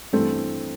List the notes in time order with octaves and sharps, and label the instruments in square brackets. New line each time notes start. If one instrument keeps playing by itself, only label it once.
[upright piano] G2 E3 A3 C4